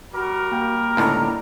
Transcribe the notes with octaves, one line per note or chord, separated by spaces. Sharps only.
G3 F#4 A#4
A#3 G5 G6
C#2 A2 D3 A#5